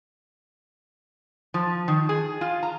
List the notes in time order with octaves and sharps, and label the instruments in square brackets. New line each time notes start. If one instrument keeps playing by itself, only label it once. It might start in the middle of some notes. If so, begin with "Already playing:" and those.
[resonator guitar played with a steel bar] F3
D#3
G#4
F4
A#5